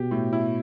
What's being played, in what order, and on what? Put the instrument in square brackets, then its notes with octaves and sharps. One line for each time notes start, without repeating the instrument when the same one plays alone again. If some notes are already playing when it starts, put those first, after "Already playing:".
Already playing: [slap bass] B2 [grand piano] G4
[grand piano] A2
E4